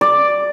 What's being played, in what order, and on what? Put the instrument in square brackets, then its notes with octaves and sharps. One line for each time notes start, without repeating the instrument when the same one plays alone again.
[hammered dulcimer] D5